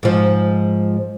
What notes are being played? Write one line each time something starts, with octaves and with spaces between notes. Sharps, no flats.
G#2 F3